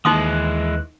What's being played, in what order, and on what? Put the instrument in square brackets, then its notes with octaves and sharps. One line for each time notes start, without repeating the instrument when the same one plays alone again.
[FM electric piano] D#2 F#6 [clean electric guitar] E3 G#3 [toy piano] D#4 C6 D#6